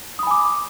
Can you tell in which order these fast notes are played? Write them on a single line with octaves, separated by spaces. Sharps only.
D#6 B5 G#5 D6